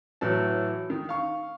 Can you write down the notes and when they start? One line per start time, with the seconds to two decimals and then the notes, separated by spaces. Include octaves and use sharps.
0.21 A2 E3 F#3 A5
0.90 D#3
1.09 F5 C#6